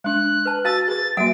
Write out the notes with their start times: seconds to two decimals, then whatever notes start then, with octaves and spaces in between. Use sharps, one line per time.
0.04 G#3 D4 F#6
0.45 B4 A5
0.65 F#4 F5 A5 E6 A6
0.88 G#4 B4 A6
1.17 F#3 A#3 F#4 E5 F#5 D7